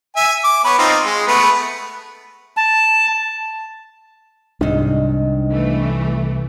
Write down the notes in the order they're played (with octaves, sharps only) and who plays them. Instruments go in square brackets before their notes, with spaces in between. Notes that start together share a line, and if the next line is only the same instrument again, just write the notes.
[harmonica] E5 G#5
D6
B3 B4 C#5
C4 D#4 F4
G#3
A3 B3 B4
[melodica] A5
[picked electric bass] C2 [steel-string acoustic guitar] G#2 D#3 [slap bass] D4
[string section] E3 A3